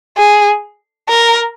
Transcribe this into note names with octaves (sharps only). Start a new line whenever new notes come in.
G#4
A#4